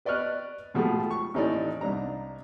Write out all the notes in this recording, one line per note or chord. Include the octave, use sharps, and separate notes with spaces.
B4 D5 D#5 C#6 F6 F#6
G#2 B2 F3 A3 G4 G#4
C#6
A1 D#2 D#4 E4 D5
C2 D4 D#4 A#5